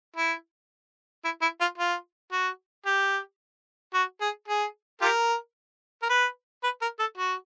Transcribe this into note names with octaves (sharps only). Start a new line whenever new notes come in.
E4
E4
E4
F4
F4
F#4
G4
F#4
G#4
G#4
F4 G4 A#4
A#4
B4
B4
A#4
A4
F#4